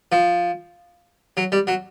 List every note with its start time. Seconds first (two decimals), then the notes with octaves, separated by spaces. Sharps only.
0.12 F3
1.37 F#3
1.52 G3
1.67 F#3